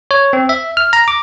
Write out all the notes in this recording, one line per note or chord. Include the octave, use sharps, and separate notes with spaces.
C#5
C4
E5
F6
A#5
D6